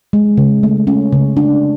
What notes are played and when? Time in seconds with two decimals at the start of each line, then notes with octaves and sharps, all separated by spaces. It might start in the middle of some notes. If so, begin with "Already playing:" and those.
0.13 G#3
0.38 C#3
0.63 A3
0.87 C#4
1.13 C#3
1.37 D4